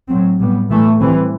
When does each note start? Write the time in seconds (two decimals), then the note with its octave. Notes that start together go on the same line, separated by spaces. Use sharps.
0.08 A2 F#3 C4
0.39 A2 G3 B3
0.70 A2 E3 A3
0.99 E3 G3 C4